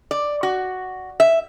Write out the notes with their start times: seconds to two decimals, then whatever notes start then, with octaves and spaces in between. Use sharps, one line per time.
0.11 D5
0.43 F#4
1.20 E5